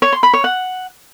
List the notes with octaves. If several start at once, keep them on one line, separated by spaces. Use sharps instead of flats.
C#5
C6
B5
C#5
F#5